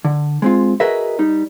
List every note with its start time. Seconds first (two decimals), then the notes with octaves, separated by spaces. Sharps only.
0.05 D3
0.42 G#3 C4 F4
0.80 F#4 G#4 A#4 B4 D#5 E5
1.19 G3 D#4